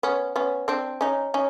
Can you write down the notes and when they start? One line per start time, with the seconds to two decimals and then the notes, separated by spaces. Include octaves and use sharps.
0.03 B3 C#4
0.36 B3 C#4
0.68 C4 D4
1.01 C#4 D#4
1.34 C#4 D#4